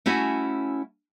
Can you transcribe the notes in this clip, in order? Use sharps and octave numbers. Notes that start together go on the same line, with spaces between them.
A3 C#4 E4 F#4 E5 G#5